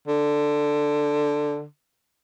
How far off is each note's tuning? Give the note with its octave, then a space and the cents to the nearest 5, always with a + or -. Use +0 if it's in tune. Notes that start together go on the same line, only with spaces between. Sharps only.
D3 +5